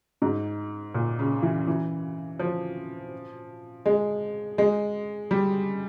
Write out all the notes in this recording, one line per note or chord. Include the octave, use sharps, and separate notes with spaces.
G#2
A#2
C#3
E3
E3
F3
G#3
G#3
G3